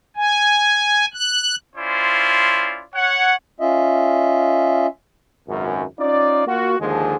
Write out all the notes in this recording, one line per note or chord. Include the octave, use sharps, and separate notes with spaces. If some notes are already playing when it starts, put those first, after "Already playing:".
G#5
F#6
C#4 E4 F4 C5 D5
C#5 F#5
C#4 F4 D#5 E5
G#1 C#2 F#2
C#4 D#4 F4 D5
A#3 F4 F#4
D#2 D3 F3 G#3